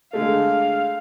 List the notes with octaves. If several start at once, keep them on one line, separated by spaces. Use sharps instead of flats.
D3 G#3 A3 F5